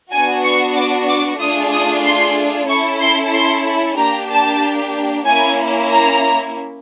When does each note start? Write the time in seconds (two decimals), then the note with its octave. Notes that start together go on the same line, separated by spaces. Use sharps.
0.11 B3 D4 F#4 G#5
0.44 C#6
0.75 D6
1.08 D6
1.39 A3 D4 F4 G#4 D#6
1.72 D#6
2.04 C6
2.68 C#4 E4 A4 C#6
3.00 C6
3.33 C6
3.65 B5
3.97 A#3 D4 G4 A#5
4.30 A5
5.26 A#3 C#4 E4 G#5
5.90 A#5